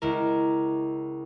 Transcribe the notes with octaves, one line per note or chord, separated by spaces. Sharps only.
C#2 E4 A#4